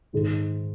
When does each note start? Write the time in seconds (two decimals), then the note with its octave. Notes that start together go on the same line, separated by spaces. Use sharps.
0.13 G#2 D#3 G#3